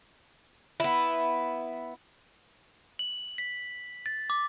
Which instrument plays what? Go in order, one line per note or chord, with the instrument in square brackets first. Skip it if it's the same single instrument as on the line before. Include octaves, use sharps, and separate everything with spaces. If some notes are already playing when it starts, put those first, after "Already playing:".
[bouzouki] B3 E4
[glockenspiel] F#7
B6
A6
D6